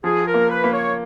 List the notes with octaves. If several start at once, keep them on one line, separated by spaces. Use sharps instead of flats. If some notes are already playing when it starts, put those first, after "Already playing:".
F3 G#4
A#4
A#3
B4
A#3
C#5